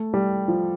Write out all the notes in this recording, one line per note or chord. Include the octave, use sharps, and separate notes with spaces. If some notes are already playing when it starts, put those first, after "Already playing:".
Already playing: A3
G3
F3